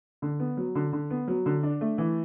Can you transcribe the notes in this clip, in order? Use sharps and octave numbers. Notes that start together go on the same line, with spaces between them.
D3
B3
F#3
D3
D3
B3
F#3
D3
D4
A3
E3